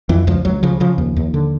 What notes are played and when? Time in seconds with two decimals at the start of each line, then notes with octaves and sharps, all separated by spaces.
0.09 F2 E3
0.27 C#2 F3
0.45 C#2 F#3
0.63 C#3 F3
0.80 C#3 F3
0.98 D#2
1.16 D#2
1.34 D3